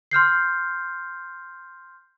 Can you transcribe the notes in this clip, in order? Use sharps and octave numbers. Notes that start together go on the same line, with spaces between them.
C6 F6 G6 C7